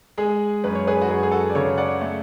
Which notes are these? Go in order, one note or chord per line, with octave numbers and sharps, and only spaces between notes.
G#3 G#4
F#2 B4
C#5
G#4 B4
F#4
F#2 G#4
G#4
F#4 A4
D5
C#3 A4 C#5
D5 F#5
A3